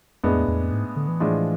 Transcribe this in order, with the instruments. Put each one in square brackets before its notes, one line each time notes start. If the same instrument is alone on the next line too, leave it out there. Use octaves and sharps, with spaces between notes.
[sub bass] F2 [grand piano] A2 G#3 B3 D4 G#4
[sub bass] E2
E2
F2
G#2
D3
E3
[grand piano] A2 F3 G#3 D4 F4